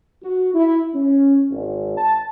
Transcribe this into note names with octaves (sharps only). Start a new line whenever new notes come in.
F#4
E4
C#4
G#1
A5